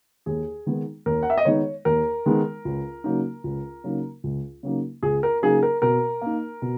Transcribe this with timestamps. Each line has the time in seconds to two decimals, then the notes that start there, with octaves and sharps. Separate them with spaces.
0.26 D#2 G#4
0.66 D#3 G#3 B3 D#4
1.06 D#2 A#4
1.23 F#5
1.30 E5
1.38 D#5
1.45 D#3 G#3 B3 D#4 C#5
1.85 D#2 A#4
2.26 D#3 G#3 B3 D#4
2.65 C#2
3.04 C#3 F#3 A#3 D#4
3.44 C#2
3.84 C#3 F#3 A#3 D#4
4.24 C#2
4.63 C#3 F#3 A#3 D#4
5.03 C#2 G#4
5.23 A#4
5.42 C#3 F#3 A#3 D#4 G#4
5.63 A#4
5.82 B2 A#4
6.22 A#3 D#4
6.62 B2